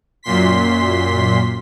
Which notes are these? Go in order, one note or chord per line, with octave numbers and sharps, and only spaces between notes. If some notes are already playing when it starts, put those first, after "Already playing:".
F#2 A#2 C6 B6